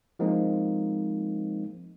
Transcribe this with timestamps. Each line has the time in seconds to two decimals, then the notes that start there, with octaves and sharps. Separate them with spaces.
0.19 F3 G#3 A#3 C4 D#4